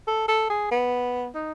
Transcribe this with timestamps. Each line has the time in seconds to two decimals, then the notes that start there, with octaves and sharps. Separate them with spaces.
0.07 A4
0.28 A4
0.50 G#4
0.71 B3
1.35 D#4